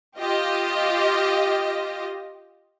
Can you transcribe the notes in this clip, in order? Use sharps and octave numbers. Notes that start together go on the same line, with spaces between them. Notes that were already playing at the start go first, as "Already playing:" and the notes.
F4 G4 D#5